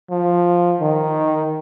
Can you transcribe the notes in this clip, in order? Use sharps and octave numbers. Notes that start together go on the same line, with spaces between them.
F3
D#3